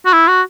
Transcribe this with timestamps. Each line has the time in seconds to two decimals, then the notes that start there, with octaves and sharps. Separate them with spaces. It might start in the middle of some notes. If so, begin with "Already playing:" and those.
0.06 F#4
0.13 E4
0.28 F#4